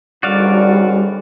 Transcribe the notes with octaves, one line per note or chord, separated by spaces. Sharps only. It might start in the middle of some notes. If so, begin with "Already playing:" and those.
G#1 F#2 D3 G3 F#4 D5 F5